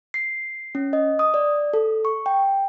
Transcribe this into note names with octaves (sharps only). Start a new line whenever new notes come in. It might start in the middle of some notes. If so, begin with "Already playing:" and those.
C7
C#4
D#5
D#6
D5
A4
C#6
G5